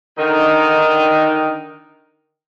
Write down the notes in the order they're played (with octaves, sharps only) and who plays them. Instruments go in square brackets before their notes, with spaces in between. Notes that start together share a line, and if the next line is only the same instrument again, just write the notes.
[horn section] D3 D#3 D#4